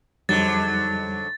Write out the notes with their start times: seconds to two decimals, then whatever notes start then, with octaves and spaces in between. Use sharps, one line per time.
0.29 F2 G#2 D3 F#3 G3 A6